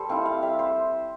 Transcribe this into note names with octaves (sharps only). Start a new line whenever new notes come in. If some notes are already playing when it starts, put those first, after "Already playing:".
Already playing: G3 A4 C5
C4 E4 F5
F5
G3 E5
C5